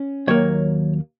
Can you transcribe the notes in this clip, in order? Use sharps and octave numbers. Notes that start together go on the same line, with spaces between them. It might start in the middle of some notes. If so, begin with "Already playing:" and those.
Already playing: C#4
D#2 D#3 F#3 A#3 C#5